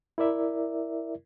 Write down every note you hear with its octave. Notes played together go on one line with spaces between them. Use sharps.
E4 A#4 D5 E5